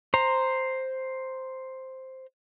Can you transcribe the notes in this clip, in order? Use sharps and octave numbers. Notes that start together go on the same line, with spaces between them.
C5 A#5